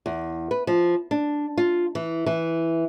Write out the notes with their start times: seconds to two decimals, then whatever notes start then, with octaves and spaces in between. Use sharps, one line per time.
0.06 E2
0.51 B4
0.67 F3
1.11 D4
1.58 F4
1.95 E3
2.26 E3